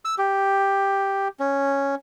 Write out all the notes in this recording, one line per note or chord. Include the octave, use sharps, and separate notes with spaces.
E6
G4
C#4